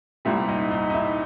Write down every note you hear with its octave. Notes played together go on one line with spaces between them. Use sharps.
C2 A#2 G3 E4
D#4
D#4
D#4
E4